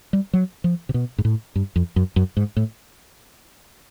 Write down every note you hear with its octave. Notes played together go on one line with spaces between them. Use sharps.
G3
F#3
F3
C3
B2
G#2
A2
G2
F2
F#2
F#2
G#2
A2